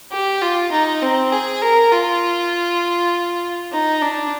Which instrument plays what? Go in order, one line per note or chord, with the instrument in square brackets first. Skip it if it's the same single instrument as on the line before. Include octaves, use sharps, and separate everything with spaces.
[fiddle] G4
F4
D#4
C4
G#4
A#4
F4
D#4
D4